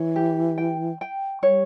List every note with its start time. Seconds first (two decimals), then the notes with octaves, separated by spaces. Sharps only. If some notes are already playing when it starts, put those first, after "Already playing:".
Already playing: E3 C#5
0.16 G4
0.58 G5
1.01 G5
1.43 G3 C#5